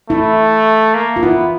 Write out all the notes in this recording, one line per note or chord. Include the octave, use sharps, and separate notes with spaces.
A3 E4
A#3
F4
B3 E4